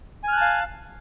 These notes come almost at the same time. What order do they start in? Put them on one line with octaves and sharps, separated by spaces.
G#5 F6 F#6 A5 F5